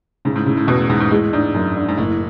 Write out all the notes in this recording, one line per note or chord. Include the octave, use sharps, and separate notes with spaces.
G#2 C#3
A2
G#2
A2 C#3
A2
E2 B2
A2
E2 G#2
G#2
A2 G#3
G#2 D4
F#2
D4
G#2
F#1 A2